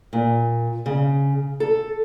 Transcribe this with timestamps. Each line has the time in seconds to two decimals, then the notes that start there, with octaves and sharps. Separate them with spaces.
0.13 A#2
0.86 C#3
1.60 A4